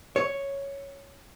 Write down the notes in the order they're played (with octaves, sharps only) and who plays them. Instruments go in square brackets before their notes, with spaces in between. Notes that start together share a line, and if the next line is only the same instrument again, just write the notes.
[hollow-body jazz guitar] C#5